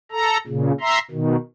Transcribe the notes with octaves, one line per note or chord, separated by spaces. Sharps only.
A4 A#5
A#2 C#3
E5 A#5 C6
B2 D#3